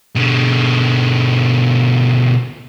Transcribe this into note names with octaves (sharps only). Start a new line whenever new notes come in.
B2 D3